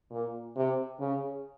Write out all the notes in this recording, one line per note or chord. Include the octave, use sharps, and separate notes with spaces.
A#2
C3
C#3